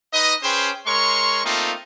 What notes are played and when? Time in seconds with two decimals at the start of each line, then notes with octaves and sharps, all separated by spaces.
0.13 D#4 B4 D#5
0.43 C#4 G#4 B4 C5 G5
0.86 G#3 A#4 C#5 C6 C#6
1.45 A3 A#3 C4 D#4 F4